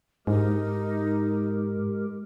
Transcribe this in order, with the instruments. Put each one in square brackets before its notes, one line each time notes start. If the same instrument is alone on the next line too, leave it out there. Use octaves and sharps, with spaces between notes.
[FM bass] G#2 [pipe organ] G#3 G4 A#4 [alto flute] D#4